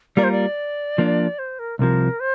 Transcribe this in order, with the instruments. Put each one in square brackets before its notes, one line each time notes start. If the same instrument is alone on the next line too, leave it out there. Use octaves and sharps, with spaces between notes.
[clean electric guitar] G3 A#3 F4 A#4 [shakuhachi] D5
[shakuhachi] C5
D5
[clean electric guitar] F3 A#3 D4
[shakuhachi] C5
A#4
[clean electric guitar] C2 C3 F3 [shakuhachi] A#4
[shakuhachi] C5